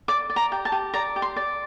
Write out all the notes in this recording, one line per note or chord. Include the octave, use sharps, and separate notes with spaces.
D5 D6
D5
A#5
G4
A5
G4
D5 A#5
G4
C6
D5